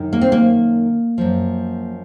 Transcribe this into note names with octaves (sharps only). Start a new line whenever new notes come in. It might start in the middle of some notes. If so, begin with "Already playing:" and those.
Already playing: F#2 D#3
A#3
C4
A#3
F#2 F3